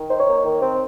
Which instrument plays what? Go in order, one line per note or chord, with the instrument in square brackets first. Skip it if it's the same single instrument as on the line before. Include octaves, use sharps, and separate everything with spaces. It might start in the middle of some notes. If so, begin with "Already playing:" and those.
Already playing: [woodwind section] D#3
D#4 C5
C#5
A#3
D#3
C4